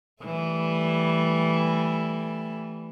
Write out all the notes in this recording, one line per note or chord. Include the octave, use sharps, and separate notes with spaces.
E3 G3 A3